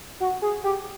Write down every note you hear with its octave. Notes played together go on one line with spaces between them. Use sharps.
F#4
G#4
G4